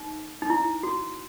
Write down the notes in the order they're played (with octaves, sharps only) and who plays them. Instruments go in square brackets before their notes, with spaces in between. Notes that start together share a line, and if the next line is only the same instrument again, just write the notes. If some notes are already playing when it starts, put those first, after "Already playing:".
Already playing: [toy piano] D#4
D#4
E4
F#4